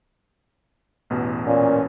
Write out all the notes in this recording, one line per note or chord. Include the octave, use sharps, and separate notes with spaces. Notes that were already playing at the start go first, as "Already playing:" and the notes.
A1 E2 B2
A#2 C#4